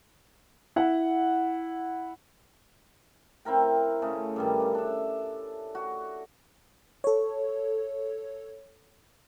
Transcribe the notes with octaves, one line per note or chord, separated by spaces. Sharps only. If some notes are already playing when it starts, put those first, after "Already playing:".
E4 F#5
C4 E4 A#4 G5
C#3 A3 G#4
G2 D#3 G3
C#3
D4 E5
F#4
A4 C#5